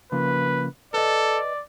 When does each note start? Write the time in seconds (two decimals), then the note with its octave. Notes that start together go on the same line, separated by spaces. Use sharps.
0.12 C#3 F3 A#3 B4
0.94 A4 B4 D5 D#5